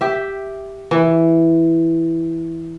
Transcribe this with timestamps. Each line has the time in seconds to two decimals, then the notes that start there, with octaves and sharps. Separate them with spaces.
0.01 G4 E5
0.91 E3